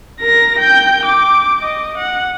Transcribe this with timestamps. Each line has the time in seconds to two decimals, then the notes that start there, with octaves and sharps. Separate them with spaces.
0.21 A#4 A#6
0.59 G5 G6
1.06 D6
1.61 D#5
1.98 F#5